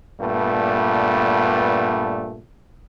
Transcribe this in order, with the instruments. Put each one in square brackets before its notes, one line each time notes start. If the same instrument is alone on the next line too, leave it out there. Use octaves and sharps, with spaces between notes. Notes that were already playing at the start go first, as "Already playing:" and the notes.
[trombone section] G2 A#2 A3 B3